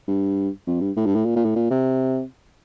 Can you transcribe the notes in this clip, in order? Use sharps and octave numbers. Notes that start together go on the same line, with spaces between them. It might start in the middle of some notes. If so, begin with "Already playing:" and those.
G2
F2
G2
A2
G2
A2
A#2
A#2
A2
A#2
C3